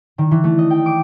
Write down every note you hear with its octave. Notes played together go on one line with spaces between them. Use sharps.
D#3
E3
A3
D#5
G5
D6